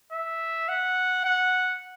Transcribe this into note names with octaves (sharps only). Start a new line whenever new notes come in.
E5
F#5
F#5